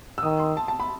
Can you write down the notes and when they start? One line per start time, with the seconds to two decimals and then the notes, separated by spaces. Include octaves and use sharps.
0.18 E6
0.23 D#3 D#6
0.39 C6
0.57 A5
0.68 A5
0.80 B5